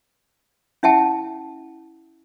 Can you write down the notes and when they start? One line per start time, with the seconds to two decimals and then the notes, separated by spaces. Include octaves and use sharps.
0.83 C#4 E4 E5 F#5 G5 A5